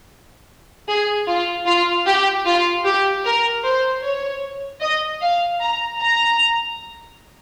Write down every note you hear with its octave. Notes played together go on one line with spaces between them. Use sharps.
G#4
F4
F4
G4
F4
G4
A#4
C5
C#5
D#5
F5
A#5
A#5